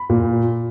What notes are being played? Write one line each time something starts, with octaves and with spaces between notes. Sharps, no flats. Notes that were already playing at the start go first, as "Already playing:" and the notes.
Already playing: B5
A#2